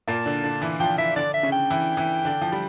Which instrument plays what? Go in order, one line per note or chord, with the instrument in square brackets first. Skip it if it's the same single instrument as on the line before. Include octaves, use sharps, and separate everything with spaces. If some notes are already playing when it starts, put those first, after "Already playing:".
[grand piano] A#2 A#3 [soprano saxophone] A5
[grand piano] D3 D4
D3 D4
E3 E4
[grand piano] F3 F4 [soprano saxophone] G5
[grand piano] E3 E4 [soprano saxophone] E5
[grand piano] D3 D4 [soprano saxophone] D5
[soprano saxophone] E5
[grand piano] C#3 C#4
[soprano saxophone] G5
[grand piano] E3 E4
E3 E4
D3 D4
F3
G3